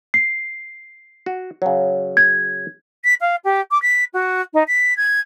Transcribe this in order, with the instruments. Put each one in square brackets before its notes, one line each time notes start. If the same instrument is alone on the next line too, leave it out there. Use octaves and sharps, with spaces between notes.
[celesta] C7
[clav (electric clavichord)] F#4
C#3 F#3
[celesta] G#6
[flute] B6
F5
G4
D6
B6
F#4
D#4
B6
G#6